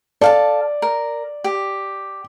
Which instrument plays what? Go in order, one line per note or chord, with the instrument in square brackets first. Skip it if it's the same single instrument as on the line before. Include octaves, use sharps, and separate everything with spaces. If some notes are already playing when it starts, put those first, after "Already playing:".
[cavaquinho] A4 F5 A5 [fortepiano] D5
[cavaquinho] A#4
G4